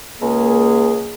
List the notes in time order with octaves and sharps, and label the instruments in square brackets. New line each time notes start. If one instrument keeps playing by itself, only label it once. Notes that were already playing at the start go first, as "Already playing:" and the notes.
[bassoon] C#2 [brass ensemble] A#3 G#4